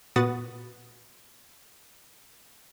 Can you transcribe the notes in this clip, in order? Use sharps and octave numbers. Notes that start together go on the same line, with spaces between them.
A#2 B3 F#4 F#5 D#6 A6